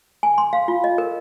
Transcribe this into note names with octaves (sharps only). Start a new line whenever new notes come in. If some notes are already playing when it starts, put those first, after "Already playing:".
G#5
C6
F5
F4
D#5
A#4